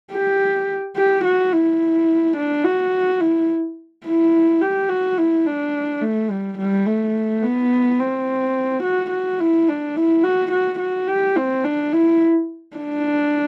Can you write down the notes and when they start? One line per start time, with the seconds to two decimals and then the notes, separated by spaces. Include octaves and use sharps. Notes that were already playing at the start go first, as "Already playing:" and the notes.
0.12 G4
0.97 G4
1.25 F#4
1.53 E4
2.37 D4
2.64 F#4
3.21 E4
4.06 E4
4.62 G4
4.89 F#4
5.18 E4
5.46 D4
6.02 A3
6.31 G3
6.58 G3
6.86 A3
7.42 B3
7.99 C4
8.83 F#4
9.11 F#4
9.40 E4
9.68 D4
9.96 E4
10.24 F#4
10.52 F#4
10.80 F#4
11.08 G4
11.36 C4
11.64 D4
11.93 E4
12.76 D4